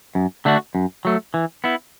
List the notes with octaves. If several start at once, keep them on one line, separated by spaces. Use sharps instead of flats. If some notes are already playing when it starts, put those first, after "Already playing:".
F#2
D3 A3 D4 F#4
F#2
F#3 A3
E3
B3 E4